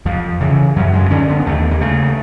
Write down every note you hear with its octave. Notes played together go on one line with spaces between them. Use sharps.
F2 F3
C#3 E3
F#2 F#3
G#3
D3 C#4
B3
D#2 A3
A#3
C#3 A3